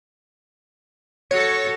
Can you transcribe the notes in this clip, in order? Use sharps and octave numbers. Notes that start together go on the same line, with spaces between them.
F#4 A4 C#5